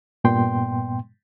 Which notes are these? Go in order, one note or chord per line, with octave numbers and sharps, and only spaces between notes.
G2 A#2 B3 G5 C6